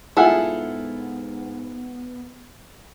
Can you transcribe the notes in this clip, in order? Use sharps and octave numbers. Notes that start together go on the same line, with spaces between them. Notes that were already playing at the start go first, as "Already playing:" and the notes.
G#2 B3 E4 F4 G#4 A4 F#5